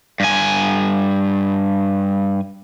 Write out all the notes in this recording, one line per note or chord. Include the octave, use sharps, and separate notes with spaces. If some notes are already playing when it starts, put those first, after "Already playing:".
G2 G#5